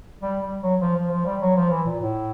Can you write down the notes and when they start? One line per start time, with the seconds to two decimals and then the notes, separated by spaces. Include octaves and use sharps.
0.21 G3
0.42 G3
0.61 F#3
0.81 F3
0.96 F3
1.11 F3
1.26 G3
1.41 F#3
1.56 F3
1.70 E3
1.86 A#2
2.00 A2